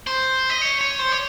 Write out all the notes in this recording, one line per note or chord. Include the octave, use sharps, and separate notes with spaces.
C5
D#5
C#5
C#5
C5
C#5